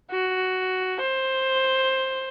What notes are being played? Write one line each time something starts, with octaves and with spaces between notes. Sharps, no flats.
F#4
C5